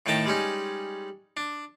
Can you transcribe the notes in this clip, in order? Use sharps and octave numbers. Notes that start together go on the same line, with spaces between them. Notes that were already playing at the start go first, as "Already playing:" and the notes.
A2 D#3 A3 G5 A5 A#5
G3 G#3 C#4 D#4
D4